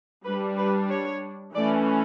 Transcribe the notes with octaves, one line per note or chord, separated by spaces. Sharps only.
G3 D4 B4
B4
C#5
E3 A3 C#4 D5